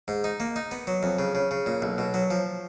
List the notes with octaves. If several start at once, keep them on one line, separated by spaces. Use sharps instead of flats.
G#2
D#4
A#3
D#4
B3
F#3
F2
C#3
C#3
C#3
A#2
B1
B2
F#3
F3